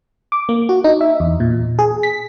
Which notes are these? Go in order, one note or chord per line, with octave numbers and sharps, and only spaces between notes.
D6
A#3
F#4
D#4
E5
E2
A#2
G#4
B6